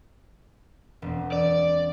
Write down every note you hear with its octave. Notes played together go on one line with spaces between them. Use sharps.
E1 C4
D5